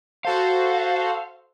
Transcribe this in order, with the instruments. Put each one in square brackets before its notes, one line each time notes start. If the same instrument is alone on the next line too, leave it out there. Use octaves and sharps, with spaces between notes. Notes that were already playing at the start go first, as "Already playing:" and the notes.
[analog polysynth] F#4 A4 C5 [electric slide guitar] F5